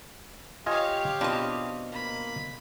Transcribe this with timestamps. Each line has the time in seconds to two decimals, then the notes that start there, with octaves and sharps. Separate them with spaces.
0.66 F4 G4 C#5 D#5 F5 G#5
1.21 B2 C4 D4 F4 D#5
1.92 A#3 B5